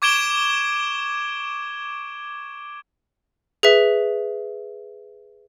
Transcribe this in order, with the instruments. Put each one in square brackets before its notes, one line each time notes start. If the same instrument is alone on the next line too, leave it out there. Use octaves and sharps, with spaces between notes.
[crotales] C#6 D6 G#6 D7 E7 G7
[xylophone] G#4 B4 E5